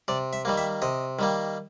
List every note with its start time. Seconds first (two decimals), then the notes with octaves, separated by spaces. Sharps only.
0.08 C3 D5
0.33 E5
0.45 D#3 G3 A#3
0.57 E5
0.82 C3 D#5
1.19 D#3 G3 A#3